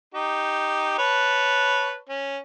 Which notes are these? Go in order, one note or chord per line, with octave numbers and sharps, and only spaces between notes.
D#4 G4
B4 C#5 A5
C#4